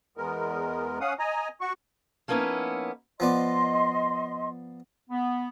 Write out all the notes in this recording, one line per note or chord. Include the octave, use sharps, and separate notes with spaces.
E2 G#3 B3 A#4
C#4 F5 F#5 D#6
D#5 G#5 A#5
F#4 C#6
F3 A#3 B3 C#4 D#4 E4
F3 B3 D5 D#5 C6
B3